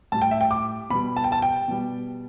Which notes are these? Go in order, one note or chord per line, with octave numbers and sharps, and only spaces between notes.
A2 G3 A5
G5
E5
G5
D6
B2 G3 B5
A5
G5
A5
G5
B2 G3